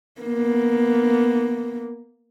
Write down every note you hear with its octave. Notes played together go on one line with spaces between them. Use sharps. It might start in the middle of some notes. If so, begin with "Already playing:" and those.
A#3 B3